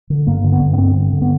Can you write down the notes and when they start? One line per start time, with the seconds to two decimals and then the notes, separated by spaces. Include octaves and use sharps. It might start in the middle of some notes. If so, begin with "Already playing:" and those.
0.10 D3
0.27 G2 A#3
0.44 D3
0.52 B3
0.61 G2
0.73 B3
0.78 D3 C4
0.95 G2
1.13 D3
1.22 B3